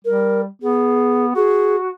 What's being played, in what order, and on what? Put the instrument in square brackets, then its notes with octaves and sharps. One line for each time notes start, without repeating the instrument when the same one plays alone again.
[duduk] G3 [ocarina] A#4
[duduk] B3 [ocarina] G#4
[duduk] F#4 [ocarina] G#4